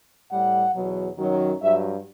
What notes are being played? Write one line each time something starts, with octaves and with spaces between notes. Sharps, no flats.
A2 G3 F#5
E2 B2 F#3
F#2 D#3 F#3
G2 F#3 E5